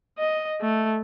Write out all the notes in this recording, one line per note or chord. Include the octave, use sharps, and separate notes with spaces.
D#5
A3